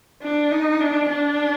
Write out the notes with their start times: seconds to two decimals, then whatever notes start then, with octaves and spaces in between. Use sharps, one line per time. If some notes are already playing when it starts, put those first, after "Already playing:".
0.22 D4
0.51 D#4
0.80 D4
1.09 D4